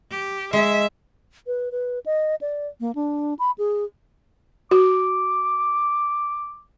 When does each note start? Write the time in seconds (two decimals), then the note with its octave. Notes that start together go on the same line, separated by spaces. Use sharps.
0.11 G4
0.53 G#3 E5
1.47 B4
1.72 B4
2.06 D#5
2.41 D5
2.80 A#3
2.95 D4
3.39 B5
3.58 G#4
4.71 F#4 D6